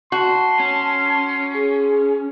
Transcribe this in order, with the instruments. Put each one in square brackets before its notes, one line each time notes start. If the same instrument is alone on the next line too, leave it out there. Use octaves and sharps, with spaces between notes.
[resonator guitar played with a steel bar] F#4 [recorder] A5 [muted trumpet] C6
[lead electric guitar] C#4
[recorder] G#4